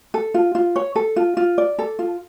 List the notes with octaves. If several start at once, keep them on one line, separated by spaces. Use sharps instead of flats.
A4
F4
F4
C#5
A4
F4
F4
D5
A4
F4